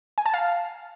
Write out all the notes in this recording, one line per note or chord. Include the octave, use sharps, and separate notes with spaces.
G#5
A5
F5